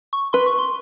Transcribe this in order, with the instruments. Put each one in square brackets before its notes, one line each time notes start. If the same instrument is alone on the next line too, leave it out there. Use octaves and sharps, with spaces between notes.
[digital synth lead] C#6
[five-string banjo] B4 [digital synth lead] C6
[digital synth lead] C#6
C6